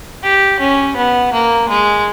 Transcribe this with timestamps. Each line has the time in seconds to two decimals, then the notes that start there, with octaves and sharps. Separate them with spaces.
0.23 G4
0.60 C#4
0.96 B3
1.33 A#3
1.69 G#3